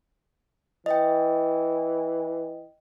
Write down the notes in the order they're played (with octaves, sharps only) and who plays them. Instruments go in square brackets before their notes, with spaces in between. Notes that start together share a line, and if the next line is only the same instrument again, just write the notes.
[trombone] E3 [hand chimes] D#5 G5